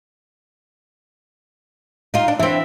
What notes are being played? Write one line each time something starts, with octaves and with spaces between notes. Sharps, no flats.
D#4 F4
D4
E3 C4 E5